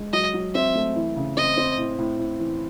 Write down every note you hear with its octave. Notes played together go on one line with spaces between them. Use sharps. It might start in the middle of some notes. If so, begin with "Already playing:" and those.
Already playing: G#3
F#3 D#5
F#3
C4 E5
A3
E3
C#3
C4 D#5
C4
A2
A2
A2
E3